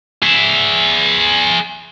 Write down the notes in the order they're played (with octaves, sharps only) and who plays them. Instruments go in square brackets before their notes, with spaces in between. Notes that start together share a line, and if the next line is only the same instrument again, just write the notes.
[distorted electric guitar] G#4 E5